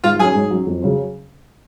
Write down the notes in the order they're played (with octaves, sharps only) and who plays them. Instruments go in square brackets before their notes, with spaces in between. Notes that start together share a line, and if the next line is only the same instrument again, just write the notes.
[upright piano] G#2 [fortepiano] F4 F5
[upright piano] F#3 C#4 [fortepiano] G#4 G#5
[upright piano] G#2
F#3 C#4
F2
C#3 F#3 C#4